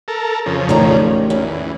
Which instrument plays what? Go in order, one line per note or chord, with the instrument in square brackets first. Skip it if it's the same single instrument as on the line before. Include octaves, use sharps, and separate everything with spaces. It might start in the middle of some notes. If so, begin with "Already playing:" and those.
[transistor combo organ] A4 A#4
F2 C#3
[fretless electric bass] A1 A2 D#3 [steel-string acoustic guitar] C#4 D5 A#5
[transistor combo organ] E2 [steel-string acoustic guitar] C#4